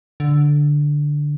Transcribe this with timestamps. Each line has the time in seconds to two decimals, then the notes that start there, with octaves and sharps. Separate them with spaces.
0.20 D3